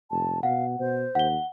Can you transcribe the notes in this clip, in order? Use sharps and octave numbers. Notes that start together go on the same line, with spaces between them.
F1 A5
B2 F5 F#5
B2 C5
D#2 F#5 G7